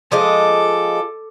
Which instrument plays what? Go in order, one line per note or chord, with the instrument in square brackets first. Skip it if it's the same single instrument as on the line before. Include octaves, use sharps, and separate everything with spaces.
[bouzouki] F3 G#3 D#5 [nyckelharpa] A4 D6